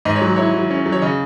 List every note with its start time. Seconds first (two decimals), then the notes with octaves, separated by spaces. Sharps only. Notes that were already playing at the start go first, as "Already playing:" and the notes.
0.05 G#2 D#5
0.16 C#5
0.21 F#3
0.36 E4 C#5
0.54 F#3
0.70 C#4
0.86 F#3
0.92 C#5
1.02 C#3 D#5